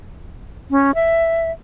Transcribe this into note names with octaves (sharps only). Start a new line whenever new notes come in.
C#4
E5